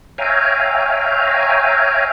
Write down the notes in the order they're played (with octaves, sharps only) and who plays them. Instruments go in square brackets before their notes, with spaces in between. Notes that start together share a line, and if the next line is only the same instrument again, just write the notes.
[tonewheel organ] C#5 E5 F5 G5 G#5 A#5